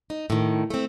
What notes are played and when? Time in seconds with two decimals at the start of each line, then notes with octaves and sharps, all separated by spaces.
0.10 D#4
0.30 A2 D#3
0.70 A3 C4